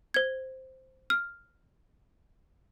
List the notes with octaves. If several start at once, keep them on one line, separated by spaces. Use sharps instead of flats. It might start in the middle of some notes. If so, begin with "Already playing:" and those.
C5 G#6
F6